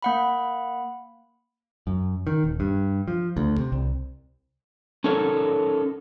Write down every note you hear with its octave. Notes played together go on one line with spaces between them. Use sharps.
A#3 F#5 B5
F#2
D#3
D#1
G2
F3
D2
C3
C2
C#4 D#4 A4 A#4 C#5